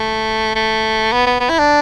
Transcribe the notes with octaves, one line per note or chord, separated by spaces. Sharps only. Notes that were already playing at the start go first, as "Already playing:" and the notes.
Already playing: A3
A3
B3
B3
B3
E4
D4